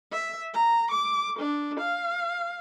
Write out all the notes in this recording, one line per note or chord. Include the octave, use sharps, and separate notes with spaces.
E5
A#5
D6
D4
F5